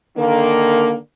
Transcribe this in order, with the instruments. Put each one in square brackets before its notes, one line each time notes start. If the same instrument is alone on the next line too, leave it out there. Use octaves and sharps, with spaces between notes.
[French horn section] D3 D#3 A#3